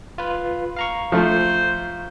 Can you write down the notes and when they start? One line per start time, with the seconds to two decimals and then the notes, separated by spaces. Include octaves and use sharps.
0.18 F4 B4
0.76 F5 A#5 C#6
1.12 F3 A3 C5